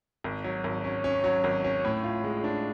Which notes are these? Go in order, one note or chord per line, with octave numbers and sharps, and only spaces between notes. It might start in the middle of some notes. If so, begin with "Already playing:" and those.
G#1
F#3
G#1
C#4
C#4
F#3
G#1
C#4
A2
F4
G#3
D4